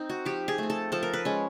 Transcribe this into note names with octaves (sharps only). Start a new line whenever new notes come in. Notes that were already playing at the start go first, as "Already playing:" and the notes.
Already playing: C4 D#4
F#4
F3 G4
G#4
A3 C4
A4
F3 A4
A#4
B4
G#3 C#4